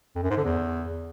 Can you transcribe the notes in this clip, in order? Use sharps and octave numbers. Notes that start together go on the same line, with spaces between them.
F2
F#2
G#2
D3
E2